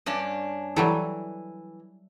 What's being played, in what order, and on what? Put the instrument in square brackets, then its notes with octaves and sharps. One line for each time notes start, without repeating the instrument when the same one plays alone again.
[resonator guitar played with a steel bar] G2 C#4 D4
[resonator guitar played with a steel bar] E3 [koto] F#3 G3 A4